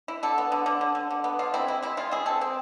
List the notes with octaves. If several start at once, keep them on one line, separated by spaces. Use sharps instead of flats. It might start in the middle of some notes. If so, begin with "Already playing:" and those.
E4
D3 A4
B3
D3
D3
D3
D3
D3
B3
D3 F4
C4 E4
G#3 E4
G#3 E4
G#3 F4
E4 G#4
C4 A4
C4